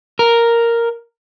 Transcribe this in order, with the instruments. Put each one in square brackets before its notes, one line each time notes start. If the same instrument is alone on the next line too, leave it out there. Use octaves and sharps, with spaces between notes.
[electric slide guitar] A#4